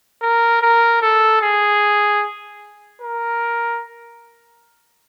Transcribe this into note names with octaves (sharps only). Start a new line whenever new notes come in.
A#4
A#4
A4
G#4
A#4